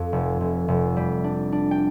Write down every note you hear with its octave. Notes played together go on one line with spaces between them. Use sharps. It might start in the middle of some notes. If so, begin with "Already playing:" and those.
Already playing: F2 A4 F5
F1
F1
F1
G3
D4
D4
G5